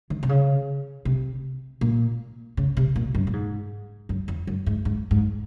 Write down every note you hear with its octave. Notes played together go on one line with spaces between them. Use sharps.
D#3
C3
C#3
C3
A#2
C#3
C3
A#2
F#2
A#2
G#2
F#2
F2
F#2
G#2
G#2
G#2